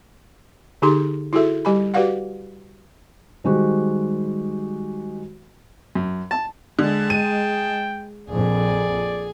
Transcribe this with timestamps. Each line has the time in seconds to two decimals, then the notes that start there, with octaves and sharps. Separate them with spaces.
0.82 D3 D#4 G4 G#4 C6
1.33 E4 F#4 G#4 A4 E5
1.65 G3 G4 G#5 B5
1.94 F#4 G4 B4 D5 F5 F#5
3.44 D#3 G3 G#3 F#4 G4 C5
5.95 F#2
6.31 A5
6.79 D3 G#3 G#4 A5
7.10 G5 D#7
8.28 A#1 F2 G#4 D5 G#5